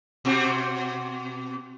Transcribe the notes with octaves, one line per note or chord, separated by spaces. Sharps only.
B2 C4 F#4